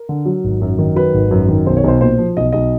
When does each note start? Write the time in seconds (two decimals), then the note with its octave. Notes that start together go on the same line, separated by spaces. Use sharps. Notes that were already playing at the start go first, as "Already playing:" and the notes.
Already playing: A#4
0.09 D3
0.26 F#3
0.44 G#1
0.62 F#2
0.79 D#3
0.96 F#3 B4
1.14 G#1
1.31 F#2
1.49 D#3
1.66 B1 C5
1.77 C#5
1.84 B1 C5
2.01 A#2 C5
2.18 F3
2.37 B1 D#5
2.52 B1 D#5